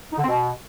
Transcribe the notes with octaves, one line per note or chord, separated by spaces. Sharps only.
D#4
D3
C4
B2